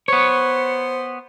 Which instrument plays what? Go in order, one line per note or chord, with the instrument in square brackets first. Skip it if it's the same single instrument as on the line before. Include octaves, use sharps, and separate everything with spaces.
[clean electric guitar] B3 C#5 [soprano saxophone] C5